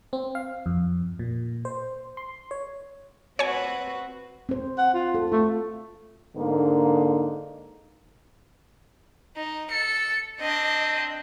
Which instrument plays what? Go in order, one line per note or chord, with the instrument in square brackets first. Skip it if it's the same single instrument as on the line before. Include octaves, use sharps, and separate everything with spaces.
[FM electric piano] C4
F5
F2
A#2
C5
C6
C#5
[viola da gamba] C4 F#4 B4 [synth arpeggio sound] C#5 G#5
[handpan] C4 C5
[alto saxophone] F#5
F4
[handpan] A4
[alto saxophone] A3 [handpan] F4
[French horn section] G#2 D3 A#3 D#4
[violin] D#4
[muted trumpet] A4 [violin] C#7
[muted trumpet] C4 [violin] D4 D#5